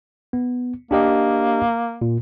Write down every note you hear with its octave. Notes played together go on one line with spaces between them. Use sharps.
B3
A#3 D4 G4 D#5
A#2